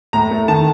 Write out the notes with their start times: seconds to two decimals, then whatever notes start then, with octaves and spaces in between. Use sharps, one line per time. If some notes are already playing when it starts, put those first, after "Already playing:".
0.13 A2 A#5
0.31 A3
0.48 D#3 A5